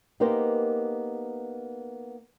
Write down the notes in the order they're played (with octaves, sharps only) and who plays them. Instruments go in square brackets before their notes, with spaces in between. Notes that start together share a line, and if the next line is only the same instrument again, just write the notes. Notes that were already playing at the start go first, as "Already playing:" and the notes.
[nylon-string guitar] A#3 B3 D#4 G4 A#4 C5